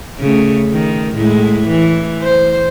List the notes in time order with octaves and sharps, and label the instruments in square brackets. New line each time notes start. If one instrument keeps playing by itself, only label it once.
[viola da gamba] C#3 A3
D#3
A2 G#3 E4
E3
C5